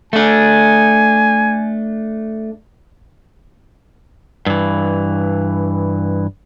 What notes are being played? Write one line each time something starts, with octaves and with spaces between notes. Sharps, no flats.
A3 D4 G#5
G2 E3